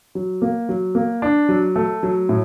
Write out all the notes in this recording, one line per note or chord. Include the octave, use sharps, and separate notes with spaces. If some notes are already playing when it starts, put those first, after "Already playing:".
F#3
A#3
F#3
A#3
D4
F#3
A3
F#3
A2